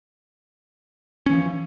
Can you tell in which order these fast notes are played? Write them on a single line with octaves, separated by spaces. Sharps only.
C#4 E3 F3